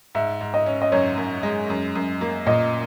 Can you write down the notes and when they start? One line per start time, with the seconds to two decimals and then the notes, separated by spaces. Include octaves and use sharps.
0.15 G#2 E5
0.41 G#2
0.54 D#5
0.66 C#4
0.82 D#5
0.92 F#2 C#5
1.18 F#2
1.43 G#3
1.70 F#2
1.95 F#2
2.21 A#3
2.47 A#2 D#5